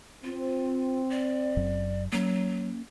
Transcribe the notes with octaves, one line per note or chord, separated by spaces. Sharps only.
C4 F4
D5
F#1 F#2 F#3
F#3 A#3 C#4